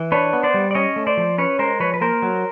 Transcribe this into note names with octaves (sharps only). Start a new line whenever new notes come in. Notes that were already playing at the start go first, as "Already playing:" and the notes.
Already playing: E3
D4 B4 C#5
B3
C5 D5
G3
D5
C#4 C#5 D#5
A3
C5 D5
F3
C#4 B4 C#5
G#3 A#4 C5
F3 B4 C#5
B4
A#3 A#4 C5
F#3